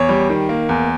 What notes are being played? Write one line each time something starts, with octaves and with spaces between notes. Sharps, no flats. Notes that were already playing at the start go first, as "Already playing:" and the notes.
Already playing: E2 C#5
G3
D#3
A#3
E2